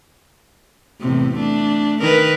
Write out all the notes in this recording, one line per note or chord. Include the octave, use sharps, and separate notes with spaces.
E2 A2 C3
A3 D4
D#3 A#4 B4